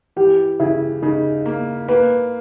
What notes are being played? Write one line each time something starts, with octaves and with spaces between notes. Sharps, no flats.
E3 G4
C#3 E4
C#3 D#4
A#3
A#3 B4